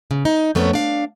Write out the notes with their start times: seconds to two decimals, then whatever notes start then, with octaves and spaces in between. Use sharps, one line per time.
0.11 C#3
0.25 D#4
0.55 F2 A3 B3 C#4 A#4 C#5
0.73 D4 F5